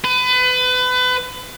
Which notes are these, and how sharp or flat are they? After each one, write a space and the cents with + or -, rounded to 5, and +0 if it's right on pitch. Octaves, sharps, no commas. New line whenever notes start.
B4 +30